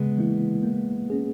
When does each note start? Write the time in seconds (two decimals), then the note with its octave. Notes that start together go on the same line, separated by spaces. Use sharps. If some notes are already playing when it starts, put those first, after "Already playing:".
Already playing: C#3 G#3 B3
0.17 E3 A#3 E4
0.63 A#3
1.10 C#4 G#4